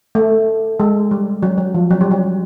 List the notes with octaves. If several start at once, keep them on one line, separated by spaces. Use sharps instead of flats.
A3
G#3
G3
F#3
F#3
F3
F#3
G3
F#3